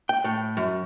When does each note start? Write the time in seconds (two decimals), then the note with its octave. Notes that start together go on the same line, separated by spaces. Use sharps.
0.09 G5
0.24 A2
0.57 F#2